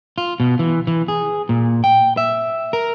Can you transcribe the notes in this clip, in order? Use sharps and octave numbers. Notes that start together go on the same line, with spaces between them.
F4
B2
E3
E3
G#4
A#2
G5
E5
A#4